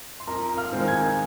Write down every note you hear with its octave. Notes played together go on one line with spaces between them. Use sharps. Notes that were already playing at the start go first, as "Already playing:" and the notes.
C6
F2 A#4 A#5
F5 F6
D#3 G#3 C4
G#5 G#6